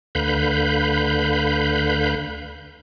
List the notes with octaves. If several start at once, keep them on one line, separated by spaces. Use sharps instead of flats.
D2 D3 B4 F5 B5 G6